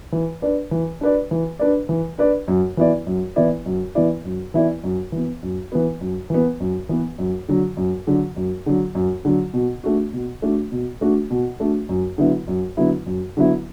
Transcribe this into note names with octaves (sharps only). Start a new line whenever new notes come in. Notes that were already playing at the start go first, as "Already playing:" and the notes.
E3
D4 B4 D5
E3
D4 B4 D5
E3
D4 B4 D5
E3
D4 B4 D5
F#2
E3 B3 E4 D5
F#2
E3 B3 E4 D5
F#2
E3 B3 E4 D5
F#2
E3 B3 E4 D5
F#2
E3 B3
F#2
E3 B3
F#2
E3 B3
F#2
E3 B3
F#2
D3 F#3
F#2
D3 F#3
F#2
D3 F#3
F#2
D3 F#3
B2
A3 D4 F#4
B2
A3 D4 F#4
B2
A3 D4 F#4
B2
A3 D4 F#4
F#2
D3 F#3 B3 E4
F#2
D3 F#3 B3 E4
F#2
D3 F#3 B3 E4